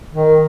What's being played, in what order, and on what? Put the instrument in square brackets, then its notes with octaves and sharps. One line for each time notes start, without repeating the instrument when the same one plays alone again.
[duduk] D#3